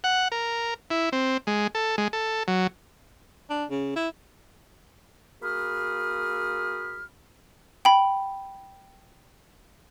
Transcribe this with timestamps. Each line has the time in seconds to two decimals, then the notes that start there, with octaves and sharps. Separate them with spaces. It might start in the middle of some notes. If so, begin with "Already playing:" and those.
0.04 F#5
0.32 A#4
0.91 E4
1.13 C4
1.47 G#3
1.75 A4
1.98 G#3
2.13 A4
2.48 F#3
3.49 D4
3.70 C#3
3.96 E4
5.42 A#3 F#4 G#4 B5 F6
7.85 G5 B5